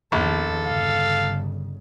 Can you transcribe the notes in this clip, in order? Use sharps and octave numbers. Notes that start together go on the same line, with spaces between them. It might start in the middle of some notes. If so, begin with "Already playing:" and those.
A#1 E2 D#3 A4
G1 C#3 F5